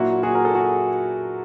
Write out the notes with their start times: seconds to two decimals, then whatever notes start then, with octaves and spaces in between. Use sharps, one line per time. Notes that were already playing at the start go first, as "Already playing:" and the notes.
Already playing: A#2 F#3 A#3 D4 E4 F#4
0.23 F#4 G#4
0.35 A#4
0.45 A4
0.55 F#4 G#4